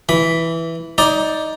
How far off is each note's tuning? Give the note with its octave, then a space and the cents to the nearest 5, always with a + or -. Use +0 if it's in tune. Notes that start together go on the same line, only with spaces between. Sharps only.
E3 +0 B5 +0
D#4 +15 D5 +0